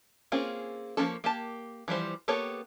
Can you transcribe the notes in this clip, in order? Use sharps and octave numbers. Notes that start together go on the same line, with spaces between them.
A#3 C4 C#4 F4 G#4
F3 A#3 C#4 A4
A#3 G4 A5
E3 F3 G3 C5
A#3 B3 G4 A4 C#5